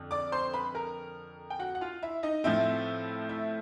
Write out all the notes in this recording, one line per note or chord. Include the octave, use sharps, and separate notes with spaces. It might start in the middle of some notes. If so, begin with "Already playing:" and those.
Already playing: F2 D3
D5 D6
C5 C6
B4 B5
A#4 A#5
G5
F#4 F#5
F#5
F4 F5
E4 E5
D#4 D#5
A2 F3 A3 C4 E4 E5
E4 E5